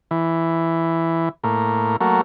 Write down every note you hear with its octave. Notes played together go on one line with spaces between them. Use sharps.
E3
A2 A#3
F#3 A3 A#3